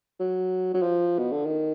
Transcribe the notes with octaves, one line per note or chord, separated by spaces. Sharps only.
F#3
F#3
F3
B2
D3
D#3